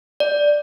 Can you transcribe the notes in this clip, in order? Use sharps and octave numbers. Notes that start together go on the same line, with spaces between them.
D5